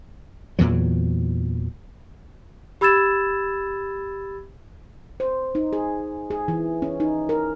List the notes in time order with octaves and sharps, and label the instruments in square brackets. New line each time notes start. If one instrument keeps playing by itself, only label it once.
[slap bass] E2 A#2 E3 F#3
[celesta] G4 B5 E6 G#6 A6 E7
[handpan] C5
D#4
G#4
G#4
E3
C#4
D#4
A#4